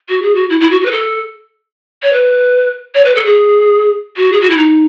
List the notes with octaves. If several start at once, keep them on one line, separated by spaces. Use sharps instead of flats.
F#4
G#4
F#4
E4
E4
F#4
F#4
B4
A4
C#5
B4
C#5
B4
A4
G#4
F#4
G#4
F#4
E4
D#4